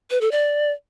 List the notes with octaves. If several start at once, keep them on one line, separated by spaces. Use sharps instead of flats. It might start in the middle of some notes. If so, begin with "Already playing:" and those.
B4
A4
D5